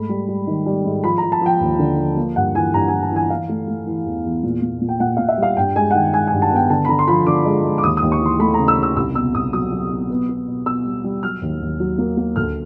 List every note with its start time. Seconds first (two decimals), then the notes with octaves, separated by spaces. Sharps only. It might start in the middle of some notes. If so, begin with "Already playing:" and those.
Already playing: G#2 A3 B5
0.09 G3
0.28 G3
0.47 D#3
0.66 G3
0.85 G#2
1.04 F3 B5
1.18 F3 A#5
1.32 A5
1.42 F3 G5
1.60 D#2
1.79 D3
1.98 F3
2.17 A#3
2.36 G2 F#5
2.55 E3 G#5
2.73 G2 A#5
2.88 E3 G#5
3.02 A5
3.12 E3 G#5
3.30 E3 F5
3.49 A3
3.68 A3
3.87 E3
4.06 E2
4.25 E2
4.43 A#2
4.62 A#2
4.81 A#2
4.89 G5
5.00 A#2 F#5
5.17 A#2 F5
5.29 E5
5.38 G3 F5
5.57 G2 G5
5.76 G#3 G#5
5.91 F#5
5.94 D#3 G5
6.13 G#3 G#5
6.27 G#5
6.32 G2
6.42 A5
6.51 B3 G5
6.70 D3 A5
6.85 B5
6.89 D3 A#5
6.99 C6
7.08 F3 B5
7.26 D3 D6
7.45 G#3
7.64 G#3
7.78 D6
7.83 D#2 D#6
7.97 D#6
8.02 D#2
8.12 C#6
8.21 E3 C6
8.39 A3 B5
8.54 C#3 A#5
8.68 E6
8.77 C#3
8.83 E6
8.96 C2 E6
9.15 B2 E6
9.34 C2 D#6
9.53 F#3 D#6
9.72 F#3
9.91 B2
10.10 B3
10.29 B3
10.47 B2
10.66 B2 E6
10.85 G3
11.04 G3
11.23 F#3 F6
11.42 D#2
11.61 D#2
11.80 F#3
11.98 A#3
12.17 A#3
12.36 D2 F6